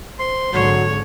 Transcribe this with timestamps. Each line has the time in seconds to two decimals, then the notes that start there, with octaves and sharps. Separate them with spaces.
0.19 C5 C6
0.53 G#1 D3 F#3 G#3 C#5